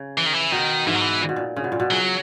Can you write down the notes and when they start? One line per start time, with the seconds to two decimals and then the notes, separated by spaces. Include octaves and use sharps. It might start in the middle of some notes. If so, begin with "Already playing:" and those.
Already playing: C#3
0.18 E3
0.26 D#3
0.33 E3
0.52 B2 D#3
0.87 G#2 E3
0.95 F#3
1.01 E3
1.21 A#2
1.29 B2
1.36 A#2
1.56 C#3
1.64 B2
1.72 A#2
1.80 B2
1.91 C#3 F#3